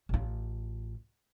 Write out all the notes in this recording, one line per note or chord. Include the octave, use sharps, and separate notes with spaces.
A1 F4